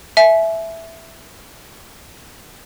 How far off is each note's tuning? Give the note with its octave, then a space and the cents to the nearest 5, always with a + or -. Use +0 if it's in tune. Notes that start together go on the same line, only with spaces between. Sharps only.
E5 +0 G#5 +35